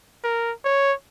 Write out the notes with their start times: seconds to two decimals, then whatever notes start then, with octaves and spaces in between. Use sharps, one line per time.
0.24 A#4
0.65 C#5